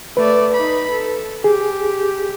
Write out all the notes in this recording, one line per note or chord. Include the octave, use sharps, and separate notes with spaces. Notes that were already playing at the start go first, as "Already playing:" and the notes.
A3 B4 D5
D#4 B5
A4
G4 G#4